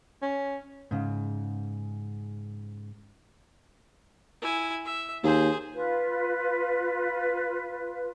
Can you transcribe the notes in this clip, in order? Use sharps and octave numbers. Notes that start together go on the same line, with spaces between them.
C#4
G#2 C#3
E4 G#5
E5
D#2 G#4 C5
F4 B4